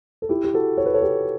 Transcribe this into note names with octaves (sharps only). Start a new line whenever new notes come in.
A4
E4 G4
G4
F#4 A4
C#5
B4
A4 C#5
G4 B4